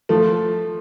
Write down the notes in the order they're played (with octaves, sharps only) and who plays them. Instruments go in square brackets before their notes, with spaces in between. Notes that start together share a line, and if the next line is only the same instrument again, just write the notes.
[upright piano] F3 [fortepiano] A3